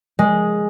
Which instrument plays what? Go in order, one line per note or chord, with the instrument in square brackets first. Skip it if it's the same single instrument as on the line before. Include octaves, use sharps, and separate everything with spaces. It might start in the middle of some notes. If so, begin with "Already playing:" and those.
[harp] G#3